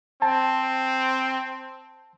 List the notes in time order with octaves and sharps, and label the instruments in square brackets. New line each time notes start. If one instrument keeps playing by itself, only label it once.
[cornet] C4 [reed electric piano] A5